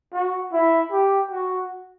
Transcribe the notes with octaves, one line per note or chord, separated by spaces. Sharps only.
F#4
E4
G4
F#4